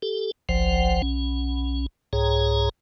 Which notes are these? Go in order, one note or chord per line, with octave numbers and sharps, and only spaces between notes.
G4 A4
G1 C2 F3 C5 F#5
B1 C#4
C2 G#2 G#4 C#5 A#5